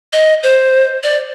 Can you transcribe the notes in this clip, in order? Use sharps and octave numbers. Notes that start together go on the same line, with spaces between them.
D#5
C5
D5